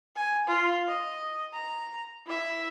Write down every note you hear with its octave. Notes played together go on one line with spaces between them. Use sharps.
G#5
F4
D#5
A#5
E4 E5